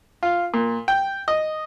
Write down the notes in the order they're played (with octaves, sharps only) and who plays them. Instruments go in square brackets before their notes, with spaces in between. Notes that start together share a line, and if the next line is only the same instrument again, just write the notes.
[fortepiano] F4
A#2
G5
D#5